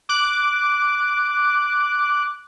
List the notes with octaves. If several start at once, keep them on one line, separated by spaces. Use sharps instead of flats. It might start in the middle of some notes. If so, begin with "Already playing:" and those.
D6 F#6